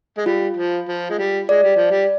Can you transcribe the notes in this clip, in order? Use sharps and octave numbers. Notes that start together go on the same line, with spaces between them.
G#3
G3 F4
F3
F3
G#3
G3
G#3 D5
G3
F3
G3